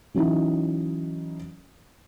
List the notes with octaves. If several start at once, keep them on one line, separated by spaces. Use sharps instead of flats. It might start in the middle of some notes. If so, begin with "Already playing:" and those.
E3 F#3 C#4 D#4 E4